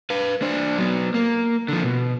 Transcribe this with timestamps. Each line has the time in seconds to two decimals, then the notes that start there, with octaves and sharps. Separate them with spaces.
0.10 B4 F5
0.42 D4 C5
0.78 F#3 B3
1.14 A#3
1.68 D3 F3
1.84 B2